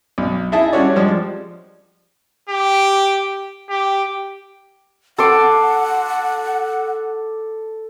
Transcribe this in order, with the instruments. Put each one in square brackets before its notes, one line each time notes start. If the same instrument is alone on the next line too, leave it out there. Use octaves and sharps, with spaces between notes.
[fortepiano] B1
D#4 E4 G#4 D#5 E5 A5
G3 C#4 D4 F#4 C#5 D5
F3 G3 G#3
[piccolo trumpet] G4
G4
[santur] A4 C6 D6 [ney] F#5